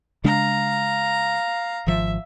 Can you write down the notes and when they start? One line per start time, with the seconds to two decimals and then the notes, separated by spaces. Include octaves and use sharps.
0.24 C#3 G#3 D4 F5 A#5
1.87 G#1 D#3 F3 E5